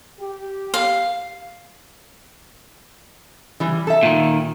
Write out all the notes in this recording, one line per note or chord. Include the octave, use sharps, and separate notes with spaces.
G4
F5
E3 G3
A4 E5
A#2 D#3